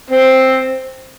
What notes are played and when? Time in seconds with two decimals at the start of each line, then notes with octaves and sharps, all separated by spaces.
0.10 C4